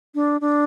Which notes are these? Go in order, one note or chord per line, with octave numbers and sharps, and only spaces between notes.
D4
D4